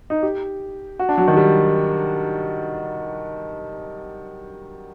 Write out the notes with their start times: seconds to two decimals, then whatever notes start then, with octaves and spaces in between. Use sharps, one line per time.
0.10 D#4
0.23 G4
0.99 F#4
1.09 D4
1.18 F#3
1.28 D#3
1.37 G3